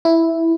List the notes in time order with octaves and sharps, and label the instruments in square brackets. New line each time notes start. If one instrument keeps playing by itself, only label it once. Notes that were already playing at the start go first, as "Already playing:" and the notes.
[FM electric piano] E4